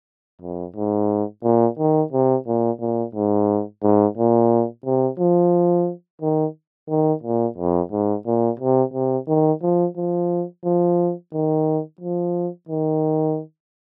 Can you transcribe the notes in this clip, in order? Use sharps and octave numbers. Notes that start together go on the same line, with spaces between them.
F2
G#2
A#2
D#3
C3
A#2
A#2
G#2
G#2
A#2
C3
F3
D#3
D#3
A#2
F2
G#2
A#2
C3
C3
D#3
F3
F3
F3
D#3
F3
D#3